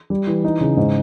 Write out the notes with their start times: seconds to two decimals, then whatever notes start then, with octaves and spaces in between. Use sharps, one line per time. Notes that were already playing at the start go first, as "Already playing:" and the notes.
0.10 G3
0.27 E3
0.45 D#4
0.60 C#3
0.77 G#2